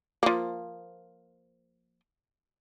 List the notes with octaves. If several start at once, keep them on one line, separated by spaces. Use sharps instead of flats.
F3 A#3